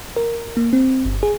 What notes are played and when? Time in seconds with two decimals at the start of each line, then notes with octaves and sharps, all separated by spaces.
0.16 A#4
0.57 A#3
0.73 C4
1.05 G1
1.23 G#4